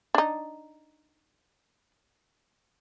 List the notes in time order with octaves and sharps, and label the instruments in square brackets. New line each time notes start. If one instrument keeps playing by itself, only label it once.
[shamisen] D4 D#4